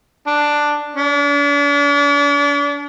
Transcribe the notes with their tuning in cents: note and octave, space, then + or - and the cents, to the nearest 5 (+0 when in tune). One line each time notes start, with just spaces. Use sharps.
D4 +5
D4 -40